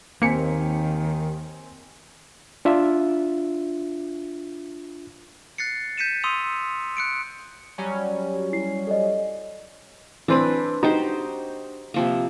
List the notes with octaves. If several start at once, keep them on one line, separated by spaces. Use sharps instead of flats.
D#2 D#3 A#3 C4 G#5 B6 C#7
D4 F4 E5
F#6 A6 C7 C#7
G6 B6 C#7 D#7 E7
C6 D#6 E6 D#7 F7
F#6 C#7 D7
F#3 G3 C#4
E4 C7
A4 D5 D#5
E3 C4 D4 B4 B5
D#4 F#4 G4 C5
C3 F3 A#3